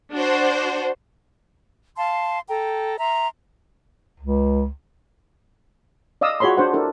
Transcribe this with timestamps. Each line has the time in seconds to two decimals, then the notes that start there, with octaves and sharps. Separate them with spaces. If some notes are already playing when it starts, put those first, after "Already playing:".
0.12 D4 F#4 C5
1.97 F5 A5 C6
2.49 A4 G5 A#5
2.99 E5 A#5 C6
4.20 C#2
6.21 D5 D#5 F5 D#6 E6
6.40 F4 F#4 G#4 C#5 B5 C6
6.57 D4 C5 F#5
6.73 D4 E4 A4 A#4